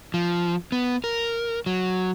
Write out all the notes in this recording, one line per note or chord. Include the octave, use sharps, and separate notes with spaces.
F3
B3
A#4
F#3